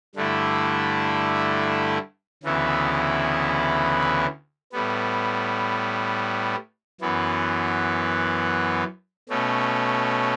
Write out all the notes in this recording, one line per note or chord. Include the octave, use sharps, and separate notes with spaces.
G2 D3 A3 E4
D2 C#3 E3 B3 E4
A2 G3 B3
F#2 E3 B3
B2 A3 C#4